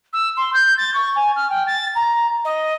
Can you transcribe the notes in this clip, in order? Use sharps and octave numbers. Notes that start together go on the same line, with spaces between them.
E6
C6
G6
A6
C#6
G#5
F6
G5
A6
A#5
D#5